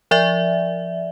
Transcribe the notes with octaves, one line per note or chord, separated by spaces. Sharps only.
F3 D5 E5